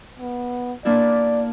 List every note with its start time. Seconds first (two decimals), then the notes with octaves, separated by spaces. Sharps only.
0.20 B3
0.85 A#3 D4 E4 D5